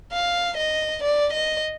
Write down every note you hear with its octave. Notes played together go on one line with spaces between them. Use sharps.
F5
D#5
D5
D#5